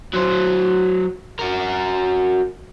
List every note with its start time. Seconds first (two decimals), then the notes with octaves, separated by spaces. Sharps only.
0.13 F#3 C5
1.39 F#4 A#4